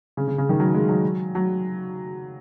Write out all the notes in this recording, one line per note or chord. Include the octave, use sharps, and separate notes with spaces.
C#3
C#3
C#3
D#3
F#3
G#3
F#3
F#3